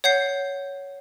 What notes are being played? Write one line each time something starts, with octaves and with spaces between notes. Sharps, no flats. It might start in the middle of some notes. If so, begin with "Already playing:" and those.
C#5 F#5 G6 C7